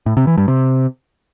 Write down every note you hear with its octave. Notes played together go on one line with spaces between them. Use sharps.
A2
C3
E3
G2
C3